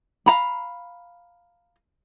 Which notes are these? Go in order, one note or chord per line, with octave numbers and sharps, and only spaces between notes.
F5 A#5 B5